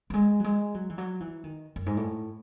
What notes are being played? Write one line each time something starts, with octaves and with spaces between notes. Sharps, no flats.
F#3
G#3
F#3
G#3
F#3
E3
F#3
E3
D#3
F#2
G#2
A2